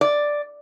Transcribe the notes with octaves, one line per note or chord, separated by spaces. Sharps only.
D5